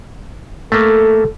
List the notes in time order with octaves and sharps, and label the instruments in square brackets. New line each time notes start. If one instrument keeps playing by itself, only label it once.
[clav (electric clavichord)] A3 A#3 [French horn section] A4